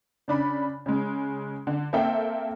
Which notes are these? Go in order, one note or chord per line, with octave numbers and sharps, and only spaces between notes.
C#3 D4 B5
C#3 G#3
D3
A#3 C4 A4 E5 G5